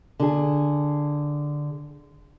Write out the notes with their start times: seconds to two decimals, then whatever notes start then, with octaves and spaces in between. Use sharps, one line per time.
0.20 D3 G#4